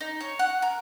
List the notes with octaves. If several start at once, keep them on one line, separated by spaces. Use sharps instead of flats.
D#4
C#5
F#5
A#4